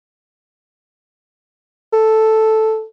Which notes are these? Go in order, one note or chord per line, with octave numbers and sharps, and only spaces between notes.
A4